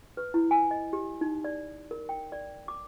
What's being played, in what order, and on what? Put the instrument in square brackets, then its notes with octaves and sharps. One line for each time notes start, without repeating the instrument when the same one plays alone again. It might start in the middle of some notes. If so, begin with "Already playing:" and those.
[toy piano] B4
E4
G#5
D#5
G4
D#4
D5
A#4
G5
D5
D6